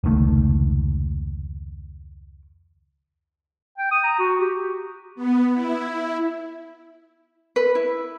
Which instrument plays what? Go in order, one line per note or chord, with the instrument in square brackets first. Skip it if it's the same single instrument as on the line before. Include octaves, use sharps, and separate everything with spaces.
[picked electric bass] F1 C#2 D#3 A3
[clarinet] G5
D#6
A#5
F#4
G4
[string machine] B3
E4
[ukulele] B4
E4